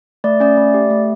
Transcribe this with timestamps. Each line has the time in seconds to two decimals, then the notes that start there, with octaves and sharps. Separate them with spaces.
0.24 A3 D5
0.40 C#4 D5
0.57 A3
0.74 G4
0.90 A3